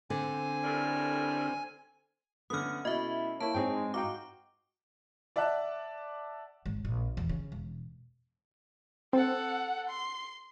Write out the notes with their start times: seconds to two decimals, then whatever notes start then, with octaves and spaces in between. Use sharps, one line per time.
0.10 D3 C4 G#5
0.63 A2 G3 A#4
2.50 D3 A3 B3 C#4 D#6 F6
2.85 B2 E4 D#5 E5
3.40 A#3 E4 C#5 A5
3.54 G#2 C4 D#4 G#4 G5
3.74 G#3
3.94 D#4 F#4 F5 G5 D6
5.36 D5 E5 F#5 A5 F#6
6.66 G#1
6.85 A#1
7.17 E2
7.29 C#3
7.52 E1
9.13 C4 A4 F#5
9.89 C6